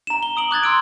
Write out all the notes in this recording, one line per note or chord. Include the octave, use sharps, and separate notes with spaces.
A#5 E7
G7
A#5 D#6 D7 F#7
D6 F#6 G#6 A6
C6 E6 D7